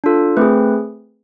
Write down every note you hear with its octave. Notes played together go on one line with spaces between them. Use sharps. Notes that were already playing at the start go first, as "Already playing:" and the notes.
D4 F4 A4
A3 C4 G#4 B4